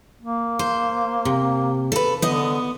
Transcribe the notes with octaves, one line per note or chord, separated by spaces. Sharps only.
A#3
C5
C3
A4 B4
D3 B3 D#5